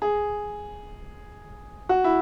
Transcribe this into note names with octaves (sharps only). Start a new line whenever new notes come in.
G#4
F#4
E4